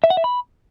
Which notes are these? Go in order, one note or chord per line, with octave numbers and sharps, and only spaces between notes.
E5
F#5
E5
B5